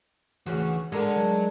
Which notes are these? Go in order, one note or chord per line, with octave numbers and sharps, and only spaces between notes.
D2 C#3 E3 F#4
G#3 D4 A4 A#4 F#5
F#3